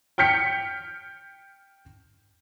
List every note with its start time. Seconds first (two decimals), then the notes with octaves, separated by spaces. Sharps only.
0.18 G5 F6 G6 B6 C#7